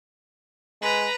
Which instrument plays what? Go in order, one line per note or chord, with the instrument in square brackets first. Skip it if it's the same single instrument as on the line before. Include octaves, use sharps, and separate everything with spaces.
[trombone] G#3 [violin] B4 A#5